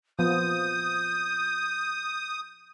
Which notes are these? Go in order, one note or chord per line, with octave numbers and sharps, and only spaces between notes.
F3 B3 D#6 G6